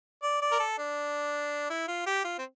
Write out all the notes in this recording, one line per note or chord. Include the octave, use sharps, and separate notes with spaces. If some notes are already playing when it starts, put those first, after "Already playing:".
D5
D5
A#4
A4
D4
E4
F4
G4
F4
C4